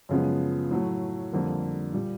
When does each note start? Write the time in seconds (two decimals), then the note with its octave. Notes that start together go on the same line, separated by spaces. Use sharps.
0.09 F#2 C#3 F3 G#3 B3
0.71 A2 F#3 A3
1.32 F2 D3 G3 A#3
1.93 A#2 G3